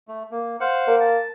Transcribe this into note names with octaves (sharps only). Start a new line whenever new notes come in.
A3
A#3
C5 F5 F#5
A#3
A5